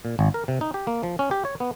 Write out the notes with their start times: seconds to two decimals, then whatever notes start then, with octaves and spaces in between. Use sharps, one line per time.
0.05 A#2
0.19 G#1
0.34 A#4
0.48 C3
0.61 D#4
0.74 G4
0.87 A#3
1.03 F3
1.19 C#4
1.31 G4
1.45 C#5
1.60 B3